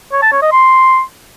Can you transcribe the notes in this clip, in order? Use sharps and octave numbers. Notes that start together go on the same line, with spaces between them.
C#5
A5
C#5
D#5
C6